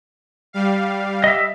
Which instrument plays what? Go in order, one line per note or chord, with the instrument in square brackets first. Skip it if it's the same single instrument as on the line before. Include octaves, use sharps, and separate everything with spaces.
[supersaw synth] G3 F5
[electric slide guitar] D#5 E5